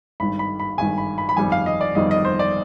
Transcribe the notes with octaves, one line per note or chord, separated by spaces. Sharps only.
G#1 G2 D#3 B5
B5
B5
G#1 G2 D#3 G#5
B5
B5
B5
G1 F2 D#3 G3 G#5
F5
D#5
D5
G1 F2 D#3 G3 D#5
D#5
C5
D5